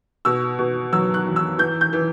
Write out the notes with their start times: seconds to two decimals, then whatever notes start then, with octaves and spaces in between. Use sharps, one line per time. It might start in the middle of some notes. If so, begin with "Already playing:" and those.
0.25 B2 E6
0.59 B2
0.93 F#3 E6
1.14 F#6
1.26 E2
1.36 E6
1.58 E3 G6
1.81 G6
1.93 E3